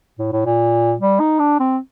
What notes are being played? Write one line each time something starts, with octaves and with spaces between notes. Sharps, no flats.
A2
A2
A#2
G3
D#4
D4
C4